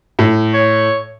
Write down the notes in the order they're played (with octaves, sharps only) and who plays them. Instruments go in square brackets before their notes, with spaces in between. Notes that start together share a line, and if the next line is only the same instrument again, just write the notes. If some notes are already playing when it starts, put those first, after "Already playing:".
[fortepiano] A2
[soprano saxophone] C#5